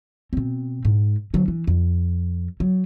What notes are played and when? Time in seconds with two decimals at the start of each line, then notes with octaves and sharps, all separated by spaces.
0.33 B2 C4
0.85 G#2
1.34 D3 F#3
1.48 E3
1.67 F2
2.60 F#3